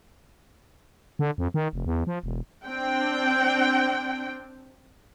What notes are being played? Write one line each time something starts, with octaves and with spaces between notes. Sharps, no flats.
D3
F2
D#3
F1
E2
F3
E1
C4 D4 G5